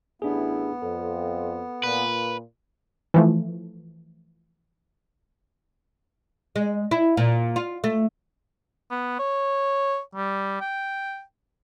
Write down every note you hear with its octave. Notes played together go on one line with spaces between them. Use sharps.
A1 B3 D4 E4 G#4
F2 A4
A#2 B4
E3 F3 A3
G#3
E4
A#2
F4
A3
B3
C#5
G3
G5